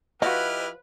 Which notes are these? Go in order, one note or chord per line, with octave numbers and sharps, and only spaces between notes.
F3 E4 F#4 G4 B4 D#5 F6